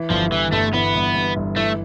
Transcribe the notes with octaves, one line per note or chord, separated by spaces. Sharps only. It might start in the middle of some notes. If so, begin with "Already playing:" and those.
Already playing: E3
G1 F3
G2 E3
G1 A3
E3 B3
G1
G2
G1
E3 A3